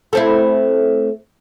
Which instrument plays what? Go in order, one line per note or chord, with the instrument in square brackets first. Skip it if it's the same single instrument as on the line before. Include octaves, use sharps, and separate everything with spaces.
[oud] A3 C4 E4